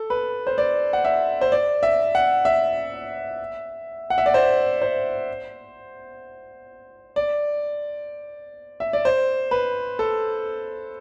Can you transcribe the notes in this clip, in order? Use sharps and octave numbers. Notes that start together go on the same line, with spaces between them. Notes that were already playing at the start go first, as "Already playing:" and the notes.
Already playing: A4
B4
C5
D5
F#5
E5
C5
D5
E5
F#5
E5
F#5
E5
D5
C5
C5
D5
E5
D5
C5
B4
A4